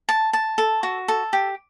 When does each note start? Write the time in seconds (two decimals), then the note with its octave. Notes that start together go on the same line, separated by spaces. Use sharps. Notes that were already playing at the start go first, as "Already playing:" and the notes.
0.09 A5
0.33 A5
0.58 A4
0.83 F#4
1.08 A4
1.33 G4